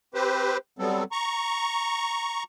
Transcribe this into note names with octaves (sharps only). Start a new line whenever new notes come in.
C4 G4 B4 C5
F#3 G3 B3 C4 A4
A#5 C#6